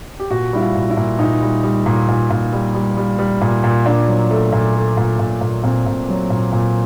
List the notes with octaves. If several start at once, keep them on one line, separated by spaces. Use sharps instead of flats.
G4
A#2 F#4
G3 E4
F4
A#2
E4
A#2
A#2 D#4
G3
G3
A#2
A#2
A#2
G3
G3
G3
G3
A#2
A#2
A#2 D4
F#3
A3
A#2
A3
A#2
A#2
A#2
A#2 C4
A#2
F#3
A#2
A#2